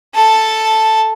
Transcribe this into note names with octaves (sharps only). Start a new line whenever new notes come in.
A4 A5